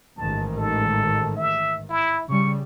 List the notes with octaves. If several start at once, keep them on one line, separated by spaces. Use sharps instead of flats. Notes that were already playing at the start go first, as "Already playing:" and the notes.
A1 G#2 D#3 A5
A4
E5
E4
C#3 G3 C#6